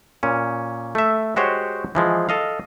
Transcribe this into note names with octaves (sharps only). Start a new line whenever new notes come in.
A#2 C#4
A3 E5
G#3 F#4 G4 C5 C#5
E3 F3 G#3
A4 D#5 F5